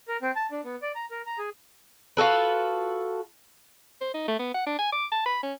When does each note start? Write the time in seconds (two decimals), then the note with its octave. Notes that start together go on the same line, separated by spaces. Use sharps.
0.08 A#4
0.22 C4
0.36 A5
0.51 D4
0.65 B3
0.82 D5
0.95 A#5
1.11 A#4
1.26 A#5
1.38 G#4
2.17 F4 F#4 A4 B4
4.01 C5
4.14 D#4
4.28 A3
4.39 B3
4.54 F#5
4.66 D4
4.78 G#5
4.92 D6
5.12 A5
5.26 B5
5.43 C#4